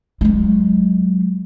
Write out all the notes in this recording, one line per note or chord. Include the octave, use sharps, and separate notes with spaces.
F#3 G#3